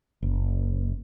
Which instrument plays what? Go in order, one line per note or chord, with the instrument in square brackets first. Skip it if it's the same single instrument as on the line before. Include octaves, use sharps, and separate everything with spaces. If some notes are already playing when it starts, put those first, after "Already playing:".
[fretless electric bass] F#1